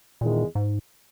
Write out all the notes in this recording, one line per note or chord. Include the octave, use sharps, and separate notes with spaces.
E2 A#2 D#3 G#3
G#2